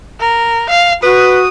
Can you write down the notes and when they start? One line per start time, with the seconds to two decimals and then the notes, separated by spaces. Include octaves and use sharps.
0.20 A#4
0.70 F5
1.03 F#4 B4 D#6